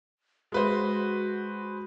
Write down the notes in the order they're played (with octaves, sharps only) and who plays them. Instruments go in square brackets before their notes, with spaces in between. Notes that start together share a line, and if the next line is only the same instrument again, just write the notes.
[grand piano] G#3 B4 C5 [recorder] F#4